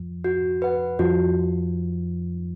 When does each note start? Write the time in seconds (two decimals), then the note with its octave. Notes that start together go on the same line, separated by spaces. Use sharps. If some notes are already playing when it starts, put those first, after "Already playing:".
Already playing: F2 F3
0.24 F#4
0.62 B4 F#5
0.99 F2 F3 F#4